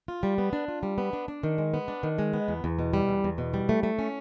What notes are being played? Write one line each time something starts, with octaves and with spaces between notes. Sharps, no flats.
F4
G3
B3
D4
F4
G3
B3
D4
D4
D#3
G#3
B3
D4
D#3
G#3
B3
E2
E2
B2
G3
E2
E2
B2
G3
A3
A3
C#4